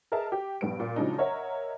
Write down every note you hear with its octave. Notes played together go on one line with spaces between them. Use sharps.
G#4 A#4 B4 D#5 E5 A5
G4
A#1 G2 B3 D7
A#2
C#3 F3 F#3 G#3 D4 D#4
A#4 C#5 D#5 E5 F#5 A#5